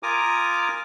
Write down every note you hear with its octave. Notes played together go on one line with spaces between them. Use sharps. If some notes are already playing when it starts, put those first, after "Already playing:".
F4 A#4 G#5 A#5 D6 D#6